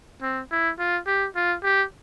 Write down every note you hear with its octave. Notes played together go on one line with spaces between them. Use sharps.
C4
E4
F4
G4
F4
G4